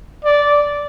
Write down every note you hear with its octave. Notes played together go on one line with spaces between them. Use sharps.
D5